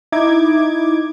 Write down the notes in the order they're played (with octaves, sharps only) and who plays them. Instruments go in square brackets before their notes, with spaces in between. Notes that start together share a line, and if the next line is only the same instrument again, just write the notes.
[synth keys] D#4 E4 D6 G#6